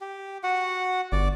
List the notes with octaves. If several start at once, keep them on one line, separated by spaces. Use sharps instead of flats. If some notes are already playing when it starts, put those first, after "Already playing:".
G4
F#4 F#5
G1 D5